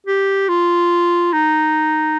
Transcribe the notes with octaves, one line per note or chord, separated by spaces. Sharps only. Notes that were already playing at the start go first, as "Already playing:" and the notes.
G4
F4
D#4